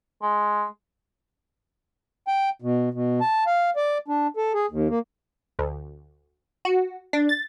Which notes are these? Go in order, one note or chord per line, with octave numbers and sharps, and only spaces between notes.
G#3
G5
B2
B2
A5
F5
D5
D4
A4
G#4
D#2
A#3
D2
F#4
D4
A6